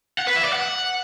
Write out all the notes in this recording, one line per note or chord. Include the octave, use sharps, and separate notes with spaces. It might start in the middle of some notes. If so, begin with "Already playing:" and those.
F#5
B4
E5
D5
F#5